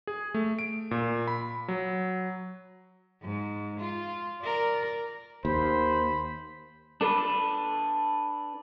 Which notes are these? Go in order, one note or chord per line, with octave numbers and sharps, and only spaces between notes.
G#4
A3
D7
A#2
B5
F#3
G#2
F4
A#4 D5
D#2 C5 B5
D4 A4 B4